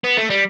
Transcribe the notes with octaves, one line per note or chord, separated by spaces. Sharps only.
B3
A3
G3